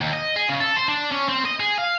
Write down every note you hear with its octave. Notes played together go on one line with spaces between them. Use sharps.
D#2
D#5
G#4
C#3
A4
C5
D4
C#4
C4
D#5
G#4
F5